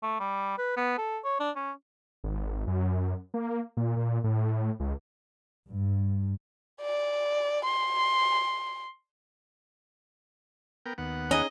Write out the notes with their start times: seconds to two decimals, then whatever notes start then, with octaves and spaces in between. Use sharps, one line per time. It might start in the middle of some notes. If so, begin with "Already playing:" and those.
0.03 A3
0.20 G3
0.58 B4
0.77 B3
0.98 A4
1.24 C#5
1.40 D4
1.56 C#4
2.24 G#1
2.67 F#2
3.34 A#3
3.77 A#2
3.96 A#2
4.24 A2
4.80 C#2
5.68 G2
6.82 D5
7.65 C6
10.86 B3 A#4 G5
10.98 D#2 B3 F#5
11.31 C#4 D#4 G#4 D#5